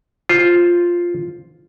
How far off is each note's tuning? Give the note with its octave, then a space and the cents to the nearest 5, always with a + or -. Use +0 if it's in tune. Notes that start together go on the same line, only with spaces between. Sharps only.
F4 +0 C5 +5